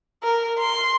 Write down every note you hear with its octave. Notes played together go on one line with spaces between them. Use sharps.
A#4
C6